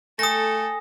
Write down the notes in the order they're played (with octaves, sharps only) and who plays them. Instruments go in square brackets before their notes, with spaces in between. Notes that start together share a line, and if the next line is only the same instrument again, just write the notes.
[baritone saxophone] A3 [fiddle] A4 [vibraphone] G5 G#5 [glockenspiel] D#6 A#6